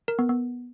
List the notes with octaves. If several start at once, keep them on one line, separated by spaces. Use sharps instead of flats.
A#4
B3
B3